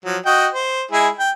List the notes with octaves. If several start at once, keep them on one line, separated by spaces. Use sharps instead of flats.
F3 F#3
F#4 D#5 G5
C5
G#3 E4 G#4
G5